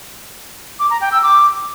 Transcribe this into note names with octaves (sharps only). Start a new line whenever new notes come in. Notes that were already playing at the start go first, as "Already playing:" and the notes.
D6
A#5
G5
E6
D6